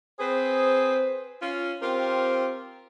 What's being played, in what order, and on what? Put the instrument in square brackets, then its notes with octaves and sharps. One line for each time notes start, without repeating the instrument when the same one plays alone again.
[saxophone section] C4 G#4 B4 [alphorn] C5
[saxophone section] C#4 F4
[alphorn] C4 [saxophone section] F4 G4 A#4